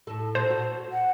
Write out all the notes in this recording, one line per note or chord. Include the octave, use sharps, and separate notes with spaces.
A2 A4
A#2 A4 C5
F#4
F#5